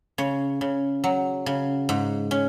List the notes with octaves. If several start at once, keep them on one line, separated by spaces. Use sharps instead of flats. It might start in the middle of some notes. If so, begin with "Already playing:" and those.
C#3 C#5
C#3
F#3
C#3
G#2
C#4